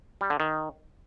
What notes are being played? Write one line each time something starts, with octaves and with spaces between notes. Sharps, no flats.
G3
D3
D#3